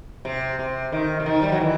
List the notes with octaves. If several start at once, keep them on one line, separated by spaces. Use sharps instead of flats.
C3
C3
D#3
C3
D#3
G3
F#3
E3